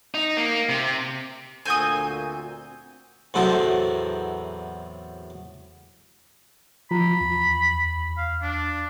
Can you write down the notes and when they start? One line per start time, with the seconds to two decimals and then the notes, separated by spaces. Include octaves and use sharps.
0.14 D#4
0.37 A#3
0.69 C3
1.65 D2 A#2 C4 F#4 G#5 D#6 G6
3.34 E2 A2 C3 F#3 A4 C5
6.91 F3 F4 A#5 B5
7.21 E2
8.17 F5
8.42 D4